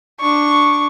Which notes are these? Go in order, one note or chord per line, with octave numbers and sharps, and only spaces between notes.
D4 C#6